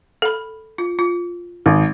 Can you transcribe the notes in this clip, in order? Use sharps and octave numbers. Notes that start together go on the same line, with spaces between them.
A4 B5
F4
F4
G#1